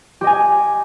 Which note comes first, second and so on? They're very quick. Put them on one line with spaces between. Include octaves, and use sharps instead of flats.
G4 D#5 G#5